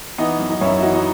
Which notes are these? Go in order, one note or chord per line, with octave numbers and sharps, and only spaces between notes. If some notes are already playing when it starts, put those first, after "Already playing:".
E3 B3 D#4
F#2
D#4
F#2 C#4 E4
E4
E3 D#4 F#4
D#4